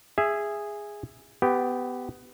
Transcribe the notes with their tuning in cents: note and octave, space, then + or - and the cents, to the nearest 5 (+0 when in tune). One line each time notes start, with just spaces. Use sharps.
G#4 -10 E5 +10
B3 +20 G4 +0